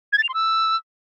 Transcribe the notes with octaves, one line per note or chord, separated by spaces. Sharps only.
G#6
A6
F7
C6
E6